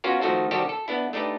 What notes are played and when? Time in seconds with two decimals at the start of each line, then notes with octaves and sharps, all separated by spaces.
0.04 B3 C#4 F4 F#4 A#4
0.22 D#3 F3 A3 D#4 F#4 A4
0.51 C3 D#3 G3 F#4 G4 A4
0.69 A4
0.88 B3 D4 E4
1.13 A3 D4 D#4 G4 B4